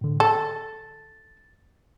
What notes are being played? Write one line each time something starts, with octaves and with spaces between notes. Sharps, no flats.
A2 D3
A4 A6